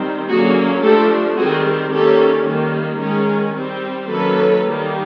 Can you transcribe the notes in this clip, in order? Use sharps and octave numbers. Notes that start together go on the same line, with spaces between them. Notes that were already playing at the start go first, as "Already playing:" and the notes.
Already playing: D#3 G3 C4
D3 F#3 A#3 C#4 F#4 G#4
F3 A3 D4 G4 A4
D#3 G3 C4 F#4 G#4
D#3 G3 A#3 C#4 G4 A4
D#3 G3 A#3
D#3 G#3 C#4 G#4 A#4
G3 C4
D#3 F#3 A#3 C#4 A4 B4
D#3 G3 A#3